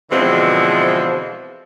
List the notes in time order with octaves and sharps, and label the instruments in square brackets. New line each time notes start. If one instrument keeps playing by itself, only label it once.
[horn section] B2 D3 E3 F3 G#3 C4